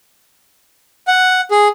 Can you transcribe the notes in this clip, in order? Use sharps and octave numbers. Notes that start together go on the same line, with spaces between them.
F#5
G#4